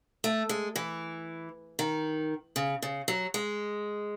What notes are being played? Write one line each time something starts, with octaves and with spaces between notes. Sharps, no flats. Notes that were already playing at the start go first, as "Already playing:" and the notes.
A3
G#3
E3
D#3
C#3
C#3
F#3
G#3